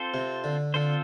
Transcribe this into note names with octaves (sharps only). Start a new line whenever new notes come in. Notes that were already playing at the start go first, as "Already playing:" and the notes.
Already playing: C4 F4 A4 C5
C3
D3
D3 C4 F4 A4 C5